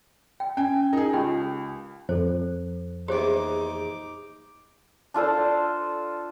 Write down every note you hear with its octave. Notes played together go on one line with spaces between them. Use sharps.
G5
C#4 G5 G#5
D#4 G#4 A#4
C#2 G4 G5
F2 A4 C5
A#1 E2 D#4 G4 C5 D6
D4 F4 A4 C5